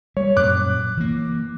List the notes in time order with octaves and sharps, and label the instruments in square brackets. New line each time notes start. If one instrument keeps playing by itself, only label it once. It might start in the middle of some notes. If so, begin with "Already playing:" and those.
[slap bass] G3 [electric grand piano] C#5
[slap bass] F#2 A#2 [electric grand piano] D6 F#6
[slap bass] E3 A#3